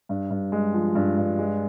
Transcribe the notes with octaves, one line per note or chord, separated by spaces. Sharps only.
G2
G2
G#3
F3
G2
G2
G#3